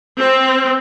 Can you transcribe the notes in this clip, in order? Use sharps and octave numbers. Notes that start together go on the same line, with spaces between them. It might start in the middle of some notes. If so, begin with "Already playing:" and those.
C4